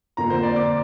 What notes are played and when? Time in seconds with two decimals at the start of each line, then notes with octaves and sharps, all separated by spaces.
0.17 F2 D3 A#3 A#5
0.30 C5
0.43 D5
0.56 D6